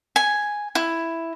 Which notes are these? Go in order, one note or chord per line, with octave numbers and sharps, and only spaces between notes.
G#5
E4